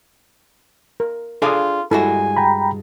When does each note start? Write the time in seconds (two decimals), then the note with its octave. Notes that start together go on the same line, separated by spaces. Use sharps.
1.00 A#4
1.42 D4 F4 G#4 A4 F5 D#6
1.91 G2 G#3 E4 F#4 A4 G#5
2.37 G5 A#5 B5